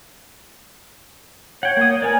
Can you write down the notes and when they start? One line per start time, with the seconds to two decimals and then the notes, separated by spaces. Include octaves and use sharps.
1.63 C#5 F#5 G5 G#6
1.77 A#3 D#6
2.02 A#4 B4 C#5 D5 G#5